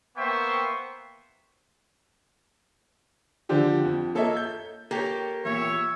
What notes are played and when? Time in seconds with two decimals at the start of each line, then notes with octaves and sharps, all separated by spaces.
0.17 A#3 B3 C5 E5 G5 C#6
3.49 D3 F3 D4 G4 C5
3.85 F2
4.15 A#3 A4 C#5 D#5 E5
4.36 G6
4.91 A#3 G4 A4 C#5
5.45 E2 A#2 C#5 E5